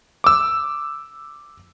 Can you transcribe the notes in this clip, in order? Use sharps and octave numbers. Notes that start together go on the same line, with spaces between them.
D6 E6